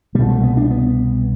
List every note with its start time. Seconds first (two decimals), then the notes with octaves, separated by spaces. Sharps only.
0.15 C2 B2 G3
0.29 A3
0.43 B3
0.57 D4
0.70 B3